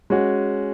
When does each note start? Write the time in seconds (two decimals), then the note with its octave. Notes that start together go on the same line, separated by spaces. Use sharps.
0.10 G#3 C#4 F#4